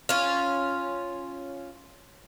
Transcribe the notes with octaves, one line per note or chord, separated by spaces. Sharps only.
C#4 F4